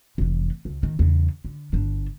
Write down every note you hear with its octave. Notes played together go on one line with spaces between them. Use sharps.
F1 E3
C#2
D#3
E2 C#3
D3
G1 D4